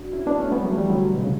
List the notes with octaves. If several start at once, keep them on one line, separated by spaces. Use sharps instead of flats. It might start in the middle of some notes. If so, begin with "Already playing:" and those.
Already playing: D4 F#4
C#4 E4
B3 D4
A3 C#4
G3 B3
F#3 A3
E3 G3
D3 F#3
B2
C#3